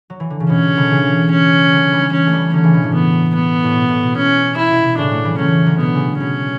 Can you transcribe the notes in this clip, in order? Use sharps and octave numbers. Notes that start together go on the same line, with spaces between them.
F#3
E3
D3
C#3
B2 C#4
B2 D3
C#3 E3
C#4
D3 F#3
E3 G3
C#4
A3
E3 G3
D3 F#3 C#4
C#3 E3
B2
A2
B3
B3
A2
B2
A2
B2
C#4
E4
B2
B2
A2 C#3 D4
F#3 A3
E3 G3
F#3 A3 C#4
D3 F#3
B2 B3
C#3
B2
B2 C#4